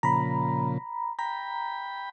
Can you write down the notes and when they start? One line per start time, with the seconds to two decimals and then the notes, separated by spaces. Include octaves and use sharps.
0.03 A#2 C#3 F3 A#5 B5
1.19 G5 A#5 B5